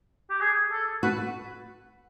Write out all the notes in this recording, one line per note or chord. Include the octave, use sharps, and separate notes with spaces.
G4
G#4
A4
F#4 B4